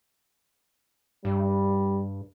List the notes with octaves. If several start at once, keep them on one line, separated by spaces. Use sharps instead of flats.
G2 G3